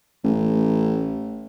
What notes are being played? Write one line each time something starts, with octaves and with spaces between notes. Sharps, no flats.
A1